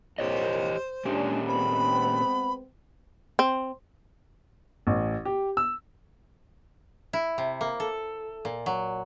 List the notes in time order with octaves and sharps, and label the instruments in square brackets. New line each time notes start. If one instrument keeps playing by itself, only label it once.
[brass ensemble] C2 F2 A#2 [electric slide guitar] G4 C#5 D#5 [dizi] C5
[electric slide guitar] A#2 C#4 G4 [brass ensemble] G#3 D4
[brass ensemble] G#3 B3 C4 [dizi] B5
[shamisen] C4
[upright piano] A1
G4
E6
[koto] E4
C3
A#3
A4
A#2
F#3